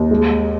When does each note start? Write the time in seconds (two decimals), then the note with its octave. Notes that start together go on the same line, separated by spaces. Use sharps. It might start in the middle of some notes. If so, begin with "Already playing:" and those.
Already playing: D#2
0.11 G#3